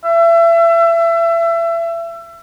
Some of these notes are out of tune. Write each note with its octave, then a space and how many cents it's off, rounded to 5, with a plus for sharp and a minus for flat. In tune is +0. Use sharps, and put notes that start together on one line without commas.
E5 +30